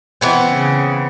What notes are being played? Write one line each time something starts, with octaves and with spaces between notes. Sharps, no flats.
E3 B3 C4
C#3